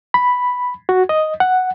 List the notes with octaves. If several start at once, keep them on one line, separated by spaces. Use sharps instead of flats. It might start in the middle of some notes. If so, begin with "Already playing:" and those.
B5
F#4
D#5
F#5